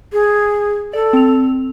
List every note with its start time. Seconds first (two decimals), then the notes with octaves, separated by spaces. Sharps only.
0.13 G#4
0.93 A4 D5
1.13 C4 F7